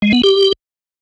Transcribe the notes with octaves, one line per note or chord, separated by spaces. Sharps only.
G#3
B3
G4